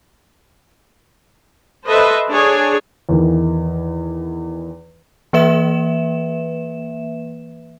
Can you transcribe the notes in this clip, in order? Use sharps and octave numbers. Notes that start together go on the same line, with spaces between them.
A4 B4 C5 D#5 E5
D4 G#4 C#5
E2 D#3 E3
E3 A#3 B4 E5 E7